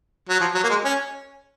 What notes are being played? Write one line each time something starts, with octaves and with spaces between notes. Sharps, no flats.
F#3
F3
F#3
A#3
G#3
C#4